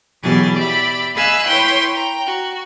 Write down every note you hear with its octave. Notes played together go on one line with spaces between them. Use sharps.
B2 E3 F#3 G4 G#4 A6
G4 D5 E5 B5
D#5 F5 G#5 B5 E6 F#6
E4 B4 C#5 G5 C6
G5 A#5
F#4